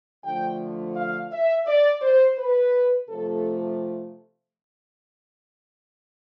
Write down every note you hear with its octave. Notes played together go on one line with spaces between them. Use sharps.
D3 F3 A3 G5
F5
E5
D5
C5
B4
C3 F3 A3 A4